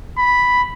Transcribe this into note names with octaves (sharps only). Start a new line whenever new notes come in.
B5